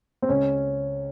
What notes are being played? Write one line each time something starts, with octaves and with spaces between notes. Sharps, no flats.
C4
C#2 C#4